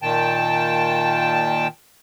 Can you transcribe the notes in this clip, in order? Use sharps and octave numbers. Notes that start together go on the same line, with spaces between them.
A#2 D#3 G5 A5